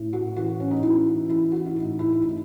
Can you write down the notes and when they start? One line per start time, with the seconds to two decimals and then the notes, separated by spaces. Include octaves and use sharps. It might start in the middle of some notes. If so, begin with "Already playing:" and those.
Already playing: A2
0.13 F#4
0.36 E3 F#4
0.60 C#4
0.71 D#4
0.82 E3 E4
1.29 E3 E4
1.52 F#4
1.66 E4
1.76 A2 D#4
1.99 E4
2.13 E4
2.22 A2 D#4